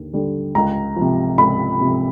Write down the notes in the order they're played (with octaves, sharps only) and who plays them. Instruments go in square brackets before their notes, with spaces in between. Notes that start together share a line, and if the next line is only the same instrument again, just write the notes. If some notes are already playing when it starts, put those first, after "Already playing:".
Already playing: [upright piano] D#2 D3
D3 G3
C#2 A#5
C3 F3
C#2 B5
C3 F3